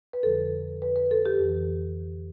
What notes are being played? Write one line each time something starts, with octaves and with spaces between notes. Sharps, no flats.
B4
F2 D3 F3 A4
B4
B4
A4
G4
F2 E3